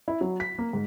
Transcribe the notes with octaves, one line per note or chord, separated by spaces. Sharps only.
E4
F#3
B6
A#3
G#2